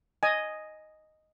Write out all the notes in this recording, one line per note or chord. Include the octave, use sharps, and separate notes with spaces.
D#5 G#5